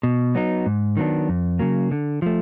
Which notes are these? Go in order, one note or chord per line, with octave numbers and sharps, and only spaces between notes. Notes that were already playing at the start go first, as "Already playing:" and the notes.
B2
F#3 B3 D#4
G#2
D#3 F#3 B3 D4
F2
C#3 F#3 A#3
D3
F3 A3